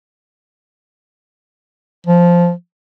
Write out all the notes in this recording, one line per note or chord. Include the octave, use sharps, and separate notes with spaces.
F3